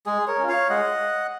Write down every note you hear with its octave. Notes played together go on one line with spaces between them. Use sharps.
G#3 G#4
A#4 C#5
C#4 F4
C#5 F5
G#3 D#5 F#5